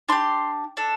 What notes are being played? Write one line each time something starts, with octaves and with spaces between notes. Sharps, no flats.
D4 G4 C6
D4 A4